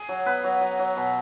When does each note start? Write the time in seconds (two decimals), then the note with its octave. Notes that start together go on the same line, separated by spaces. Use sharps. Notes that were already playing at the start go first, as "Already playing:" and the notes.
Already playing: G#4
0.09 F#3
0.26 B3 B4
0.44 F#3
0.61 F#3
0.79 F#3
0.97 B2